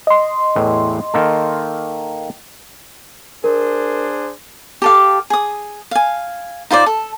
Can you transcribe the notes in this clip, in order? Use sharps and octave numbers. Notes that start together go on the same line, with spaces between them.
D#5 C6
E2 A2 E3
D#3 A#3 A4
D4 G#4 A#4 C5
G4 A4 F5
G#4 D#6
F5 G#5
D#4 F4 C5 D5
A4